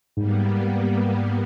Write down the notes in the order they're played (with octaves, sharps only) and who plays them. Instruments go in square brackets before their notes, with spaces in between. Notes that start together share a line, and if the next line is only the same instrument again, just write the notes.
[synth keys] G#2 [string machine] G3 A#3 B3